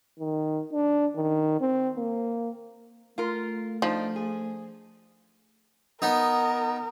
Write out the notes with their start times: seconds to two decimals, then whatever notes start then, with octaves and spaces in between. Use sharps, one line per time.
0.20 D#3
0.73 D4
1.16 D#3
1.61 C4
1.97 A#3
3.18 A3 F4 A#4
3.82 F3 D4 D#4
4.16 G#4
6.02 B3 D#4 A#4